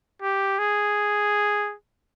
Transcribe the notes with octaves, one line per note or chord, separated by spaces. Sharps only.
G4
G#4